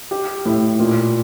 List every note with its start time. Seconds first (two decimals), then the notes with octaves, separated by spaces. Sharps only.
0.11 G4
0.45 A2
0.80 A#2